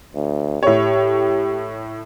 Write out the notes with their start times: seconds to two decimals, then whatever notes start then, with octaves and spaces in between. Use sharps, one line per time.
0.15 D2
0.63 A2 G4 C#5